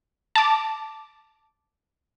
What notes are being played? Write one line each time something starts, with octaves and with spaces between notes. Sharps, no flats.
A5 D6